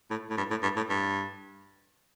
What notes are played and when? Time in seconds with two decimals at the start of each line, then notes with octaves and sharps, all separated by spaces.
0.11 A2
0.30 A2
0.37 G2
0.51 A2
0.63 G2
0.76 A2
0.90 G2